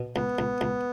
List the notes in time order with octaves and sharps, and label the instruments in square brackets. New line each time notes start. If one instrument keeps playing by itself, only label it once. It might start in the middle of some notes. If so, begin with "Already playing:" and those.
Already playing: [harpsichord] B2
[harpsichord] C#2 [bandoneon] B3
[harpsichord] C#2
C#2